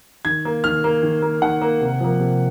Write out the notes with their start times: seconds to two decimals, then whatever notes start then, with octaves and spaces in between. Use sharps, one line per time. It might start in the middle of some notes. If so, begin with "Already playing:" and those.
0.25 D#3 G#6
0.45 A#3
0.64 D#3 F6
0.84 A#3
1.03 D#3
1.22 A#3
1.42 D#3 F#5
1.61 A#3
1.80 C3
2.00 F3 A#3
2.20 C3